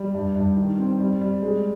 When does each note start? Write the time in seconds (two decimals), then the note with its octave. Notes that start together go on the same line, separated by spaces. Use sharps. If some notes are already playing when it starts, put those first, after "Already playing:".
Already playing: G3
0.15 G2
0.35 G2
0.57 D#3
0.79 C4
1.00 G3
1.21 G3
1.42 G#3